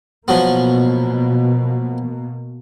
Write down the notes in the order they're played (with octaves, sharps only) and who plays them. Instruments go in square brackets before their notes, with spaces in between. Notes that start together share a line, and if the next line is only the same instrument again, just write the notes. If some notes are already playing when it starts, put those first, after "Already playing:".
[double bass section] B2 A#3 [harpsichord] F3 F#3 B3